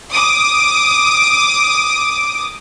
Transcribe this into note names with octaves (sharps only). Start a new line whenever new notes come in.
D6 D#6